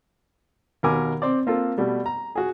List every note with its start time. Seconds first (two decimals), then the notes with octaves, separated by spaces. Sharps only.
0.83 D#2 B2 A#4 G#5 D6
1.22 C4 C5 D5
1.47 A#3 C4 F4 A4
1.78 B2 G3 A3
2.06 A#5
2.35 F#4 G#4